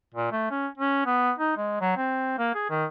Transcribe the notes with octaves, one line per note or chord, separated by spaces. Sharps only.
A#2
A3
C#4
C#4
B3
D#4
G#3
F#3
C4
A#3
G#4
D#3